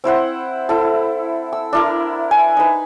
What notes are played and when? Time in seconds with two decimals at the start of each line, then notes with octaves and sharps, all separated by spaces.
0.04 C4 E4 C5 F#5
0.69 E4 A4
1.52 E6
1.73 D4 E4 A#4
2.31 G#5
2.57 D#4 B4